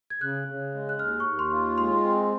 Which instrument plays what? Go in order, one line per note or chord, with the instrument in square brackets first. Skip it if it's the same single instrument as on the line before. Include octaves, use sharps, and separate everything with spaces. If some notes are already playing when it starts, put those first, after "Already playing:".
[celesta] G#6
[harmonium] C#3 [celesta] F#6
[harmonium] C#3
G#3
[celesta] F#6
[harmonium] D#2 [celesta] F6
[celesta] C#6
[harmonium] D#2
[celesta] C6
[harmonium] F4
[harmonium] G#3 [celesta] C6
[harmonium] C4